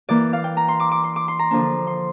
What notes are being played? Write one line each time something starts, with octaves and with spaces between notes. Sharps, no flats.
E3 A#3 E4 D5
F5
G5
A#5
C6
D6
D6
C6
D6
C6
A#5
D3 F3 A#3 D4
C6